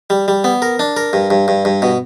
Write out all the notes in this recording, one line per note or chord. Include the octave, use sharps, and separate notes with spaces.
G3
G3
B3
A#4
D4
A#4
G2
G2
G2
G2
B2